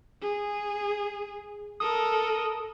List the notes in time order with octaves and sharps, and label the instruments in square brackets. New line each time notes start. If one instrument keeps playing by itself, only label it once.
[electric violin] G#4
[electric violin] A4 A#4 [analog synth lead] D#6